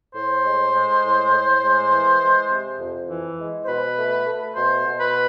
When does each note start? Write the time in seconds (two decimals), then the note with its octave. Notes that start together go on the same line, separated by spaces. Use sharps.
0.14 A2 C5
0.44 G#3
0.74 G#3
1.04 A2
1.32 A2
1.62 G#3
1.91 E3
2.21 G#3
2.49 C3
2.80 F2
3.09 E3
3.39 G#3
3.63 C5
3.67 B2 B4
3.97 A3
4.26 A3
4.55 B2 C5
4.85 B2
5.00 B4